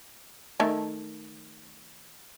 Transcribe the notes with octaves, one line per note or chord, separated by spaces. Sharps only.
D#3 A3 A4